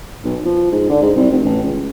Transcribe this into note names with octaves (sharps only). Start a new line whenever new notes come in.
B1
F3
G#2
D3
G#2
C2
F1
A1
C#2